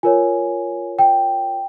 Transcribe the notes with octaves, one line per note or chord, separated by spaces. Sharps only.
F4 A#4 C#5 G#5
G5